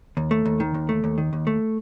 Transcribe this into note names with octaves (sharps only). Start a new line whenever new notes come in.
D#2
A3
D#2
D#3
D#2
A3
D#2
D#3
D#2
A3